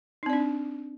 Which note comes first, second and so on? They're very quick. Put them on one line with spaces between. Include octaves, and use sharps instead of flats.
D#4 C4 D5 D4